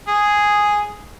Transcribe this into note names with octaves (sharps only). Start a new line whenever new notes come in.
G#4